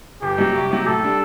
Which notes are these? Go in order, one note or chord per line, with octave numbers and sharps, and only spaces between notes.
G1 G4
F#2 F#3
C2
C3 F#3
A2 A4
G3 D4